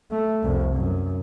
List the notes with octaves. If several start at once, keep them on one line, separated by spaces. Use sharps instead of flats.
A3
C2 F2
F#2